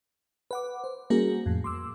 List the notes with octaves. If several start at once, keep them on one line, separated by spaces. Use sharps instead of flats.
B4 F#5 D6
C5
G3 A#3 C#4 F#4 G#4 A#4
F2 A2
C6 D6 E6